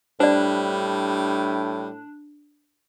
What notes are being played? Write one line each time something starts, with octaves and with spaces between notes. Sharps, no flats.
A2 G3 D4 C5 D5